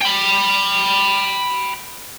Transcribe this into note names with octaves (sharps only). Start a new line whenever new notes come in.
G5 B5